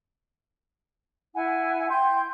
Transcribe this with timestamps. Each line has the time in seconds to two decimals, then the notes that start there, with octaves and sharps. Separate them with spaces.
1.33 E4 F#5 G#5
1.89 G5 C6 G6